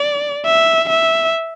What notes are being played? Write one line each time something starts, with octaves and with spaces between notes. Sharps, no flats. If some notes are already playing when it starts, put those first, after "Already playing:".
Already playing: D5
E5
E5